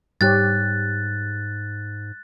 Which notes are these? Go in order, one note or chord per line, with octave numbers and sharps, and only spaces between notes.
G#2 G3 G4 C#5 F#6 A6